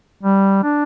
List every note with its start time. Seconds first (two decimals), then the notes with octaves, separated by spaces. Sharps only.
0.23 G3
0.64 D4